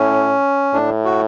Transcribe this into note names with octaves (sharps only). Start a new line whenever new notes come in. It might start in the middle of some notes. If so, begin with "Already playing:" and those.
Already playing: A2 C#4
A2 D4
F#4